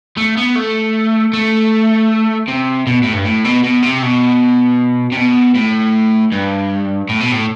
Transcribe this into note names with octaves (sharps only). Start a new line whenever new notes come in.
A3
B3
A3
A3
C3
B2
A2
G2
A2
B2
B2
C3
B2
C3
B2
A2
G2
A2
B2
A2